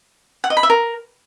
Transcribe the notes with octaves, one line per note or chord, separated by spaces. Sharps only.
F#5
D#5
B5
E5
A#4